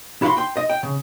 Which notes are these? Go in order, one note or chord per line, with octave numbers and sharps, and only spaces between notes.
E4 F#4 F5 B5 C6
G5 C6
D#5
G5
C#3